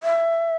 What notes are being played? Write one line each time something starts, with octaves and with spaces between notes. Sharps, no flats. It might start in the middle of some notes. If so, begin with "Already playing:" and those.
E5